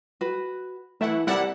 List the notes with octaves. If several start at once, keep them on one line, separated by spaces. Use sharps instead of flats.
F#4 B4
E3 A3 E4 E5 F#5
C3 G3 E4 A#4 D5 F#5 A5